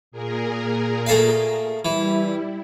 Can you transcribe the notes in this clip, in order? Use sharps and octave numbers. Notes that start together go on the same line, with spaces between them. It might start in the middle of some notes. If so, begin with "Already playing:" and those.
A#2 G#4 A#4
A3 A4 F5
E3 G3 E4